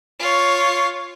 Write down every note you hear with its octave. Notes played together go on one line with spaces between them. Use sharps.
F4 C#5